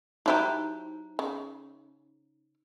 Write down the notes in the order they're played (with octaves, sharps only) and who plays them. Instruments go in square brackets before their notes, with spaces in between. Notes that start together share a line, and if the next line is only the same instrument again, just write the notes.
[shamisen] F#3 E4 G4 [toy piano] D#4 C5 A#5
[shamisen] C#3